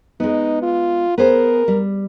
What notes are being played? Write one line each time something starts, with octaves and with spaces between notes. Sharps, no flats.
G#3 B3 D#4
F4
B3 G#4 A#4 C5
G3